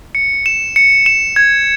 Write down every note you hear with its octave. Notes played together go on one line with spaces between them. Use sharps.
C#7
E7
C#7
E7
G#6